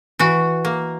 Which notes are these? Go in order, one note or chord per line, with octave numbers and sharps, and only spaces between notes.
E3 F#4
A#3